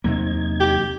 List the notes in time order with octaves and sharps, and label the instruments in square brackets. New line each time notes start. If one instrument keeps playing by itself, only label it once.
[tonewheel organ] E2 D#4 G#6 [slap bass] C3 F#3 A#3
[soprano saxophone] G4